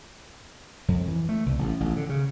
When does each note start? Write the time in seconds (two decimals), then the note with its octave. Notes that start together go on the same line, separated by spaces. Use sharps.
0.88 F2
1.08 E3
1.29 A3
1.46 C2
1.59 A1
1.80 A1
1.96 D3
2.09 C#3